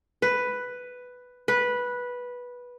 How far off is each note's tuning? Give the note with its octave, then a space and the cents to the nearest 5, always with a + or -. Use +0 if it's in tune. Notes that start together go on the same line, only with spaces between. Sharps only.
B4 +5
B4 -10